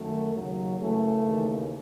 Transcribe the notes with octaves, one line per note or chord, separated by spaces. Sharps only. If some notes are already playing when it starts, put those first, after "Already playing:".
Already playing: F#2 D#3 F#3 A3
D#2 C#3 F#3
F#2 C#3 E3 A3
D#2 C#3 E3